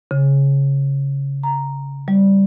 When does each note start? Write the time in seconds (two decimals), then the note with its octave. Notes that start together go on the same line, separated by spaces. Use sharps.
0.11 C#3
1.43 A#5
2.08 G3